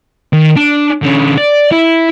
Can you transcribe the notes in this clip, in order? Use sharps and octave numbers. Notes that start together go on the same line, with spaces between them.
D#3
D4
D3 C#4
D5
E4